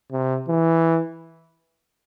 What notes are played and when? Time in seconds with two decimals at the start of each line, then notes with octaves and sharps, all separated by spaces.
0.11 C3
0.48 E3